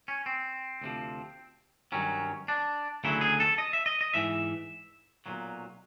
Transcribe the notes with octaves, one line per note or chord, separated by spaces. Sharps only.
C#4
C4
D2 C3 F3
G2 D#3 F#3 C#4
D4
D2 C#3 F#3 E4
G#4
A4
D#5
E5
D#5
D#5
G#2 E3 E5
B1 A#2 F#3